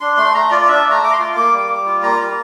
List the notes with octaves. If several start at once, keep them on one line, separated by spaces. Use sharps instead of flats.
D4 C6
A3 C6
A3 A#5
F4 D5
D5
D4 E5
A3
A#5
A3 D6
C6
F4
A#3 D6
G3
G3
F4
A#3 A#5
G3